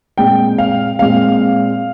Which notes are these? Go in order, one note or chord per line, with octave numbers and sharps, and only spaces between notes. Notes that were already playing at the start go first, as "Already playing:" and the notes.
A#2 G#3 C4 G5
F5
A#2 G#3 C4 F5